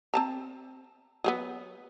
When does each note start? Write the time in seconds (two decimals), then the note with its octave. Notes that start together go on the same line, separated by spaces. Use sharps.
0.14 C4 A5 A#5
1.24 F#3 G#3 B3